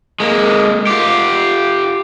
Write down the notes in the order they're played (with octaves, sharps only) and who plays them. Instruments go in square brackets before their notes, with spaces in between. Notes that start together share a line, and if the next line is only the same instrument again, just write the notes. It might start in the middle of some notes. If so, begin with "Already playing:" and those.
[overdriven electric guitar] G#3 A#3
F4 G4